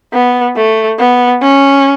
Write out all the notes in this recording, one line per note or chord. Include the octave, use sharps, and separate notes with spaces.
B3
A3
B3
C#4